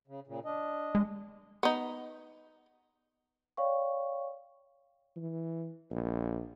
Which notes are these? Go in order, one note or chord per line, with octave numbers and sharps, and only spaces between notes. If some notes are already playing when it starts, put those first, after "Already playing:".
C#3
A#2 C#3
D4 D#5
G#3
B3 D#4
C#5 D5 F5 G5 C#6
E3
A#1